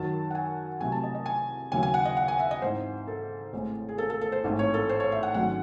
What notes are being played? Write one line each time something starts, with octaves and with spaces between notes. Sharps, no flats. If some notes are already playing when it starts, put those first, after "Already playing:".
Already playing: F#2 D#3 F#3 A5
F#5
G#5
C2 C3 F#3 A3 G#5
A5
D#5
D#5
G#5
D#2 C#3 F#3 G#5
G#5
F#5
D#5
F#5
G#5
E5
D#5
G#2 E3 C4 C5
A4
A1 A2 E3 G#3 C4
G#4
A4
A4
A4
C5
A1 G#2 E3 A3 C4
C#5
A4
C5
C#5
E5
F#5
G#1 G#2 F#3 C#4 F#5